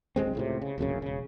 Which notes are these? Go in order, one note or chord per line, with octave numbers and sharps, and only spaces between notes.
D1 A1 G#3 C4
C#2 A2 C3
C#3
D1 A#1 F#2 C#3
E1 C#3